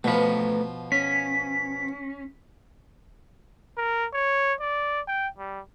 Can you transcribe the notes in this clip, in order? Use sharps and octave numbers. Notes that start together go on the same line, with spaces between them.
B2 F3 A3 B4
C#4 B6
A#4
C#5
D5
G5
G3